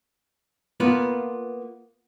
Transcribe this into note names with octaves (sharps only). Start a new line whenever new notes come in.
A#3 B3 F4 B4